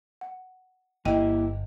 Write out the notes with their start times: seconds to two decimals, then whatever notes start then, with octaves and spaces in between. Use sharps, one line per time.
0.21 F#5
1.05 G1 A#3 E4 G4 D#5 G5 D#7